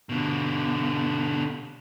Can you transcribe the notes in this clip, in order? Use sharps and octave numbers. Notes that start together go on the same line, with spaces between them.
B2 D3